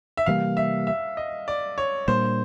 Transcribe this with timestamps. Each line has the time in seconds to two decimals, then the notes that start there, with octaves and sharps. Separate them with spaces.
0.17 E5
0.26 C3 E3 G3 A#3 F5
0.57 E5
0.87 E5
1.17 D#5
1.48 D5
1.78 C#5
2.08 A#2 G3 A#3 D4 C5